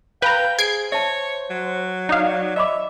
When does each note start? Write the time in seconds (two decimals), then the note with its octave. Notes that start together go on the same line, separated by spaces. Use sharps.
0.22 B4 F5 G5 A#5
0.59 G#4 C5 G#6 C7 D7
0.92 C#5 E5 A5
1.50 F#3
2.09 D#4 D5 F5
2.56 D#5 E5 B5 D6